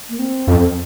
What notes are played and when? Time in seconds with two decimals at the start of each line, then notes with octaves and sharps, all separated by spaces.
0.09 A#3
0.19 C4
0.47 F2